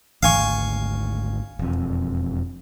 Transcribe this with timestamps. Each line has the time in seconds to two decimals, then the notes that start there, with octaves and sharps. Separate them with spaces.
0.23 G#1 D2 F5 G#5 C#6
1.59 E1 F2